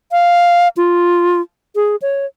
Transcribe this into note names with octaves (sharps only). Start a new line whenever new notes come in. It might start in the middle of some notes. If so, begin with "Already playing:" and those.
F5
F4
G#4
C#5